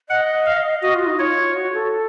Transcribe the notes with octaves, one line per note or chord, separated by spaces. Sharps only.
D#5 F#5
F5
F#4 D#5
F4
D#4
F4 C#5
F#4
A4